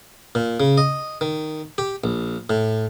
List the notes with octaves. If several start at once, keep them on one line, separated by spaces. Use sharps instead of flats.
A#2
C#3
D#5
D#3
G4
A#1
A2